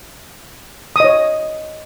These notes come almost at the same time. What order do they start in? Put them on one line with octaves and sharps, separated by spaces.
D#6 D#5 C#5